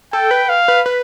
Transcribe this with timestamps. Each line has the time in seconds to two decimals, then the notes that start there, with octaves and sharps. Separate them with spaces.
0.13 A4 G5
0.31 B4
0.49 F5
0.68 B4
0.86 B4